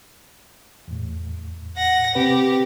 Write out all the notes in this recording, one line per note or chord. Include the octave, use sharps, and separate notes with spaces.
E2 A2
F#5 A#6
C3 C4 G4 B4